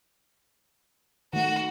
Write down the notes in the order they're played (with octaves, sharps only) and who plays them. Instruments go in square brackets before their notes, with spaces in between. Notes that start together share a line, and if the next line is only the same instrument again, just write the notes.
[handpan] D#3 A3 [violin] F#4